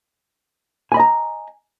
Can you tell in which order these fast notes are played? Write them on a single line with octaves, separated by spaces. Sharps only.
G#5 B5 D#5 A#5